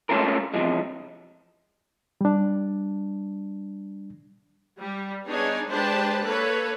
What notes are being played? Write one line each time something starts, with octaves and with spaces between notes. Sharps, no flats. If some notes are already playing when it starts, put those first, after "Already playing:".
G#3 A3 C#4 F4 A4 A#4
E2 G2 C3 F3 G#3
G3 D4
G3
B3 D4 D#4 G#4 C#5 G#5
G#3 D4 G4 B4 C5 A5
A#3 A4 B4 C#5